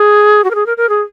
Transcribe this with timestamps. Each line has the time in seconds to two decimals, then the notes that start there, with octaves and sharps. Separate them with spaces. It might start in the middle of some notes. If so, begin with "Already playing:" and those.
Already playing: G#4
0.44 F#4
0.51 A#4
0.55 G#4
0.66 A#4
0.77 A#4
0.89 G#4